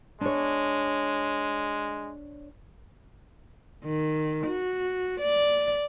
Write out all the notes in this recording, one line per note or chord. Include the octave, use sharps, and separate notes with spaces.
G#3 D4 C#5
D#3
F#4
D5